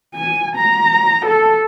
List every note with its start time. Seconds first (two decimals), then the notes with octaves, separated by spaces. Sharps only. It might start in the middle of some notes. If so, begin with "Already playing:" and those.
0.15 G#5
0.56 A#5
1.26 A4